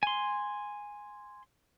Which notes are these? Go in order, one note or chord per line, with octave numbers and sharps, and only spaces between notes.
G#5 C6